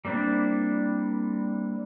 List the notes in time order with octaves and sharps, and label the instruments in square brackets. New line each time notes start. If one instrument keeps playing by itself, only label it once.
[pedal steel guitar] G3 A#3 C4 D4 E4